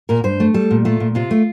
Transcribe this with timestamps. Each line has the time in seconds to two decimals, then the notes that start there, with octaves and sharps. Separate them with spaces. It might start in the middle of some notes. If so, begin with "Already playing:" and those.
0.09 A#2 A#4
0.24 G2 C5
0.40 A3
0.54 G3 A4
0.71 A#2
0.85 A3 F4
1.00 A#2
1.15 C3 F4
1.31 A3